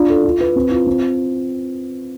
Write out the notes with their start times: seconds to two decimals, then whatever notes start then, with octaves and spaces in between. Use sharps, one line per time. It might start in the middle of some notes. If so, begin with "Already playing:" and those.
Already playing: D4 F4
0.09 A4
0.25 F4
0.40 B4
0.56 C4
0.71 F4
0.87 C4